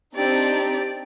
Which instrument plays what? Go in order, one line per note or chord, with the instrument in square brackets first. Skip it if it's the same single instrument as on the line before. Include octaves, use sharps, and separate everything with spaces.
[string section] C4 D4 D#4 [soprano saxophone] G4 [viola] D5